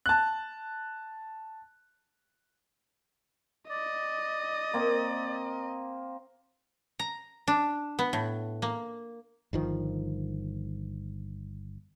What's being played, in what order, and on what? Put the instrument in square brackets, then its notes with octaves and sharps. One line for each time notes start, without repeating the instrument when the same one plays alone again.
[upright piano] A5 F#6
[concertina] D5 [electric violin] D#5
[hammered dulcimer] A#3 C4
[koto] A#5
D4
B3
A2
A#3
[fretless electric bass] G1 D#3 F3